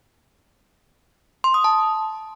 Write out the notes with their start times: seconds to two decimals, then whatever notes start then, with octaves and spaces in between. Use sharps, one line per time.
1.44 C6
1.54 D#6
1.64 A5